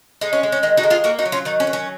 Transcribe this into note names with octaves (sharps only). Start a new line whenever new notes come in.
G#3 D#4
C#4
G#3
C#4
D#3 D#4
D#4 F#4
G#3
F4 G#4
A#3 F#4 A#4
D#4 F#4
F#3
C#4 F4
D#3 D#4
C#4
F#3
C#4